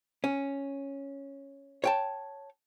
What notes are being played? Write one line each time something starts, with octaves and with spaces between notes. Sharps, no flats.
C#4
C#5 G5 A5